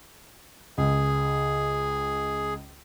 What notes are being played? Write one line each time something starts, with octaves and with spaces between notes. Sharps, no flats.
C#2 G#4